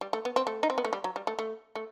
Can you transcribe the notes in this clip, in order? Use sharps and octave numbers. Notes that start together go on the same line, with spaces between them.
G3
A3
B3
C4
A3
D#4
C4
B3
A3
G3
F#3
G3
A3
A3
A3